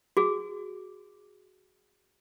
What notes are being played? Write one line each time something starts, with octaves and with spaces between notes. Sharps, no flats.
F#4 G#4